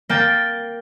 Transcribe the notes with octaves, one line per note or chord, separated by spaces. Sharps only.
A#3 G5 A6